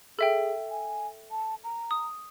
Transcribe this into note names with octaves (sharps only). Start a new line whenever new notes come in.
G#4 A4 E5 G5
G#5
A5
A#5
D#6